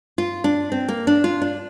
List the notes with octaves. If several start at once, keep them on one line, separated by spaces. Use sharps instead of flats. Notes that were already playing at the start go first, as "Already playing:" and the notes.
F4
D4
C4
A#3
D4
F4
D4